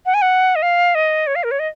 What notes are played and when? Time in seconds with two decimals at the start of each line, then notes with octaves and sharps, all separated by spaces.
0.06 F#5
0.14 G#5
0.22 F#5
0.56 D#5
0.62 F5
0.95 D#5
1.27 C#5
1.35 F5
1.44 A#4
1.51 C#5
1.59 D#5